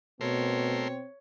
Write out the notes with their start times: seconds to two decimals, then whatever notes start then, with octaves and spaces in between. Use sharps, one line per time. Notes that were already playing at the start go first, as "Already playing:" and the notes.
0.21 B2 A3 C4 A#4 C#5 C6